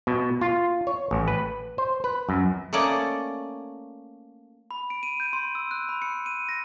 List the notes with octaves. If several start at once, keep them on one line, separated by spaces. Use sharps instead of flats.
B2
F4
C#5
A1
B4
C5
B4
F#2
A3 A#3 C#4 D5 D#5
B5
D7
D#7
G6
C6
E6
F#6
B5
C#7
D#7
A#6